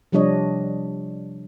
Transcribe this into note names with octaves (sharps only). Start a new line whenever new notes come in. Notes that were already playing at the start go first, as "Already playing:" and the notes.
C3 F3 G3 D4 C#5 D#5